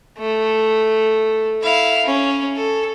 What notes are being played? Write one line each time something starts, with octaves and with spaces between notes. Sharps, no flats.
A3
E4 F5
C#4
A4